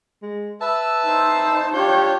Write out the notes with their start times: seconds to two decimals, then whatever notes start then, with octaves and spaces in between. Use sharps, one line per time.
0.22 G#3
0.61 B4 E5 A5 E6
1.05 D#4 C5
1.73 D4 F4 G4 C#5 G6